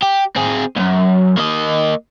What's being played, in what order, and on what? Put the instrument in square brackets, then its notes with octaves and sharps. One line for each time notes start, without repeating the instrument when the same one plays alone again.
[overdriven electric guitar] G4
C4 G#4
C#2 F#2
A#3 D#5